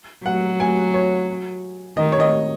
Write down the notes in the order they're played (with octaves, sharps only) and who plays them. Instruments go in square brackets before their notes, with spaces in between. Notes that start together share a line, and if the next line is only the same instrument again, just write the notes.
[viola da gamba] F#3 [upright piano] F#5
[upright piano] G#5
C#5
[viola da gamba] D#3 [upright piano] D#5
[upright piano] C#5
D#5